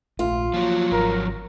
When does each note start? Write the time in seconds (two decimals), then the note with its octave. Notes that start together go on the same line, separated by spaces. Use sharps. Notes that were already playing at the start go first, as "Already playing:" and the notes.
0.19 A#1 A3 F4
0.54 F3 F#3 A#3
0.92 G#1 A#4